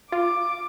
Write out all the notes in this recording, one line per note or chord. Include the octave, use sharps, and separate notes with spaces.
F4 D6